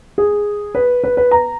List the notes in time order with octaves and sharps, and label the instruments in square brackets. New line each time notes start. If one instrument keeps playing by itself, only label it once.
[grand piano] G#4
B4
B4
B4
A#5